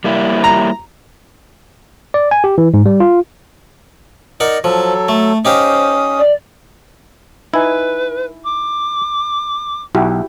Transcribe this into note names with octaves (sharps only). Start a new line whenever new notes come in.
G3 A#3 E4
A#5
D5
G#5
G4
E3
G#2
G3
F4
D#4 A#4 D5 F#5
F3 F#3 A4
A3
C#4 D#4 G4 C5 F5 D#6
D5
D#4 E4 B4 G#5
D6
B1 E4 F#4 G4